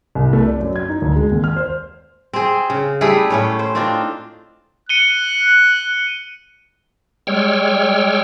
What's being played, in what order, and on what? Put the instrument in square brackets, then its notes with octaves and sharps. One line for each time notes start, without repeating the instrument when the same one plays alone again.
[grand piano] C2
A3
D5
F#2
G#6
D#4
D2
G#3
D#2
F6
C5
[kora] C4 G#4
C#3
G3 A3 E4 G#4
A2 C#4 C#5
C5
C4 D4 D#4 F4
[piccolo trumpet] F#6 [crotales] C#7 D#7 G7
[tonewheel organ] G3 G#3 C#5 G5 E6 F6